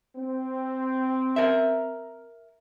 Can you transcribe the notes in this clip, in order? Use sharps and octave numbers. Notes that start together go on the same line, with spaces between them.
C4
A#4 E5